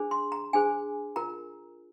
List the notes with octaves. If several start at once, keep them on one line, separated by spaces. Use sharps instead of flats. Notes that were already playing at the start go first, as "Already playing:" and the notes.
Already playing: D4 G#4 C5
C6
A#5
D4 G#4 C5 G#5
F4 A#4 A#5